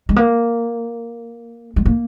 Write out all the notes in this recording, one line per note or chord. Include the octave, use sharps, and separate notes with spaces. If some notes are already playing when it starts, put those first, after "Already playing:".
G#3
A#3
G#3
A#3